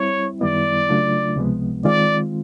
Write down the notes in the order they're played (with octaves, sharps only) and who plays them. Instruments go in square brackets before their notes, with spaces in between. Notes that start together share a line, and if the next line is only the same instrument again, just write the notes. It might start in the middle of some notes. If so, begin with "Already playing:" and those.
Already playing: [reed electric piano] G3 C4 E4 [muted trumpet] C#5
[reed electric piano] F#2 D#3 G3 B3 E4 [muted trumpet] D5
[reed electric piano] C#3 F#3 A3 D4 F4
C#2 C3 F3 G#3 B3
[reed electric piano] D#3 G#3 C4 F4 [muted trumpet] D5